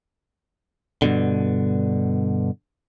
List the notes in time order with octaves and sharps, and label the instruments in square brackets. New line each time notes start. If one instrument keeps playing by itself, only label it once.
[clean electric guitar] G2 B2 D3